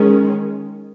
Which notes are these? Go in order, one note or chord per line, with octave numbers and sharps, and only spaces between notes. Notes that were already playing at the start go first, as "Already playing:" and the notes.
Already playing: D#3 G#3 C#4